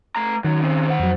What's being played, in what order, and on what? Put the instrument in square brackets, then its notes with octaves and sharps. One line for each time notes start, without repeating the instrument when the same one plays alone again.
[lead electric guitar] A3 A#5
[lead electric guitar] F#2 F#3 [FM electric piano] D#3
[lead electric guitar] C#3 C4
C5 F#5
[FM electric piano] F2 F#3